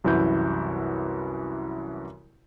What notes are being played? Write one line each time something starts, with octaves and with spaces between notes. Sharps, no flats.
C2 F#2 E3 E4 F#4 G6